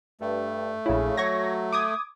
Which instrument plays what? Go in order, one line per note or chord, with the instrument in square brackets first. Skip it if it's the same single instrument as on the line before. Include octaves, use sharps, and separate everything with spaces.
[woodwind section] G2 [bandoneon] A3
[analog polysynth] A#1 E4 [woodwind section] C#3
[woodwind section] F#3 [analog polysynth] C#6 G#6 A#6
[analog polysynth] D6 D#6 G#6